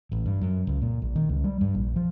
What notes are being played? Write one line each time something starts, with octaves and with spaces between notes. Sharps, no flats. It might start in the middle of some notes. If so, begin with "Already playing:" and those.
A1
G2
F#2
C#2
A#2
A#1
D#3
C#2
G3
G2
A#1
F3